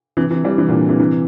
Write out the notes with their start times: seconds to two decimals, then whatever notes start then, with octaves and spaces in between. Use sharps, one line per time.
0.17 C3 E3
0.30 C3 E3
0.44 E3 G3
0.58 C3 E3
0.69 A#2 D3
0.89 C3 E3
0.99 C3 E3